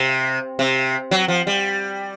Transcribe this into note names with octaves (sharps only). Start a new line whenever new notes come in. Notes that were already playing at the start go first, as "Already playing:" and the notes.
Already playing: C3
C3
F#3
F3
G3